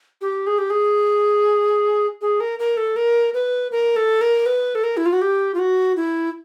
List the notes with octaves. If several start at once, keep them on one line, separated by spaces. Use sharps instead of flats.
G4
G#4
G4
G#4
G#4
A#4
A#4
A4
A#4
B4
A#4
A4
A#4
B4
A4
A#4
E4
F4
F#4
G4
F4
F#4
E4